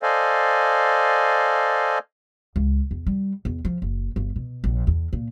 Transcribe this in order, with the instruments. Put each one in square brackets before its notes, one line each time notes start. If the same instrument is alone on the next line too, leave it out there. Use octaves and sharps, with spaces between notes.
[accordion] A4 C5 D5 D#5 F5 G#5
[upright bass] C#2
E2
G3
E2
F3
F#1
G1
B2
A#1
E2
A#2